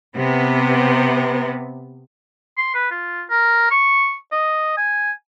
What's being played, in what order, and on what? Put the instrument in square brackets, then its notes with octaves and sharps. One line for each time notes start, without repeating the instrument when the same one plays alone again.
[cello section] C3 B3
[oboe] C6
B4
F4
A#4
C#6
D#5
G#5